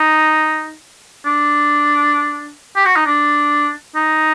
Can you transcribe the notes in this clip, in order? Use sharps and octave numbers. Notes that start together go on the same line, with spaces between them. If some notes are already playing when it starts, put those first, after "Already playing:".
Already playing: D#4
D4
G4
F#4
D#4
D4
D#4